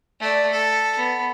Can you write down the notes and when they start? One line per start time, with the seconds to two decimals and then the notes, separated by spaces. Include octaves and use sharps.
0.20 A3 D5
0.52 A4
0.97 B3